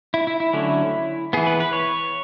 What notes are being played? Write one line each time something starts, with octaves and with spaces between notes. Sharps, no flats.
E4
E4
E4
D3 F#3 A3 C#4
E3 B3 G#4
B4
B4
C#5